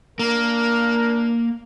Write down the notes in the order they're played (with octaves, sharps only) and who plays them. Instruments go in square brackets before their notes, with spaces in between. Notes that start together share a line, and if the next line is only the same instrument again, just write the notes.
[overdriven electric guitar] A#3 [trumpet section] D4 A#4